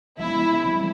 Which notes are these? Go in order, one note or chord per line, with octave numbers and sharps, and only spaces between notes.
F3 G#3 B3 E4
E3 G3 C4